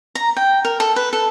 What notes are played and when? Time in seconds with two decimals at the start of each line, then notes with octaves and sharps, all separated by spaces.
0.15 A#5
0.37 G5
0.65 A#4
0.80 A4
0.96 B4
1.13 A4